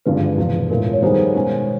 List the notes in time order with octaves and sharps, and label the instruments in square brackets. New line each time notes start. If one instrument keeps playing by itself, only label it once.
[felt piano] G#1 G2 D3 F3 G#3 [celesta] B4
[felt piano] E1 E2 C3 F3
[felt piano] A2 F3 G#3 [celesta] A#4
[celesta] C#5
[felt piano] D#3 G3 B3 D#4 G#4 [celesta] C5
[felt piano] B2 G#3 C#4 F#4